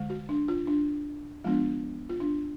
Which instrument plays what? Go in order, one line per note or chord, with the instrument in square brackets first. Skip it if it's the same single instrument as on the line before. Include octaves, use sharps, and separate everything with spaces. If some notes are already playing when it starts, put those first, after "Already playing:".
Already playing: [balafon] D3 G#3
F#4
D4
F4
D4
F3 G#3 B3 D4 F4
F4
D4